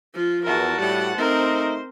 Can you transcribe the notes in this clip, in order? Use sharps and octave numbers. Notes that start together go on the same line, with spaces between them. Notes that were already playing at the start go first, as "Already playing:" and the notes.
F3 F4
E2 F#4 A#4 A5
A2 G3 G4 F#5
A3 C4 D#4 A#4 C5